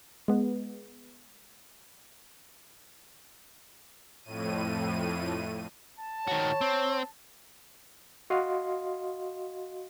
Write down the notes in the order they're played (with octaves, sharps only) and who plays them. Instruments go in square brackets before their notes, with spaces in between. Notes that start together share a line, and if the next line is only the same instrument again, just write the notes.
[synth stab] G#3 B3
[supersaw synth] F2 A2 D#7
[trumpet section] A5
[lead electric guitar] D#3 F#4 [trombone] C#5
[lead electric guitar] C4
[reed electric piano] F#4 D#5 F5 C6